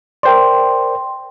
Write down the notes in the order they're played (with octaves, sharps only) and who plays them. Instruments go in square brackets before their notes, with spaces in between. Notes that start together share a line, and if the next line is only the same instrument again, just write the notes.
[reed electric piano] A#4 C5 D5 [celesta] G5 C6